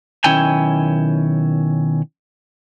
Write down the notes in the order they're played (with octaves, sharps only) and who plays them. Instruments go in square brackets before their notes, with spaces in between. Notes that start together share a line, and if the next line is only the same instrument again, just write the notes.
[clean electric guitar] B1 D#3 C#4 E4 G5 G#5